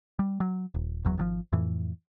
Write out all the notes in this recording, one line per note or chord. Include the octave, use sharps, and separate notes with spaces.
G3
F#3
D#1
F#1 E2 F#3
G#1 C#3 F3
F2 A2 E3